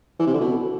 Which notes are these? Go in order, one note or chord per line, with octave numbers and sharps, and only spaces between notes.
E3
C3
D3
B2